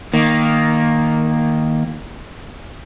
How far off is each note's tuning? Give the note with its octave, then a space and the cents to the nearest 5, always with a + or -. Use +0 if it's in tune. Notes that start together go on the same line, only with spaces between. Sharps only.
D#3 +0 A#3 +0